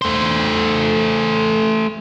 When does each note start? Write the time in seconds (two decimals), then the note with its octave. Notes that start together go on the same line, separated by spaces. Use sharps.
0.02 A3 C5